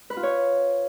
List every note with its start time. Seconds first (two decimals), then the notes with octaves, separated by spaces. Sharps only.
0.10 B4
0.17 F4
0.23 C#5